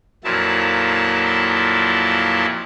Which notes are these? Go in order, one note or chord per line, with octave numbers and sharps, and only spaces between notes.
F2 A#2 F3 F#3 E4 A5